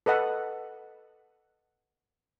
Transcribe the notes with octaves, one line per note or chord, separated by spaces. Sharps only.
A4 B4 D#5 F#5